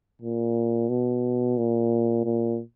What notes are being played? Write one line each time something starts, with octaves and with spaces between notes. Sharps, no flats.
A#2
B2
A#2
A#2